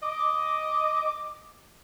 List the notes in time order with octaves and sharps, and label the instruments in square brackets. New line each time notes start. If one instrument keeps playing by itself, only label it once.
[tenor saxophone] D#5 [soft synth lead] D6